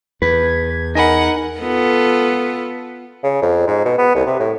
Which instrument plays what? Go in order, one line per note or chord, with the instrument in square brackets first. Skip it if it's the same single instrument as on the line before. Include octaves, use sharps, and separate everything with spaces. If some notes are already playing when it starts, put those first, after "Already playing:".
[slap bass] E2 [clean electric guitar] B4 [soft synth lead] G#6
[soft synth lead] D#4 [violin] A#4 F#5 [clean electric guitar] D#5 G#5 B5
[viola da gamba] B3 F4 A4
[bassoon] C#3
F2
G#2
B2
B3
C2
C3
A2